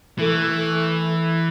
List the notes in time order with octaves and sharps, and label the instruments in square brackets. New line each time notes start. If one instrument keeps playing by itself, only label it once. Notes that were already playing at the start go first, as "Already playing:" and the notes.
[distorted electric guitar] E3 [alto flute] A3